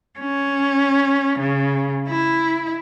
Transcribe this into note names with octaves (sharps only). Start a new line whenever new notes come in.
C#4
C#3
E4